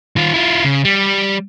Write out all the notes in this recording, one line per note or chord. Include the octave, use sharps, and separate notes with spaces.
D#3 F4
E4 F4
C#3
G3